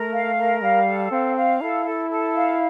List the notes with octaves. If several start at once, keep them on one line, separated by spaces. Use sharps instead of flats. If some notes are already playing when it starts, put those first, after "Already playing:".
Already playing: A3 A#4
F5
A#4
G3 F5
A4
C4 F5
F5
E4 A4
A4
A4
F5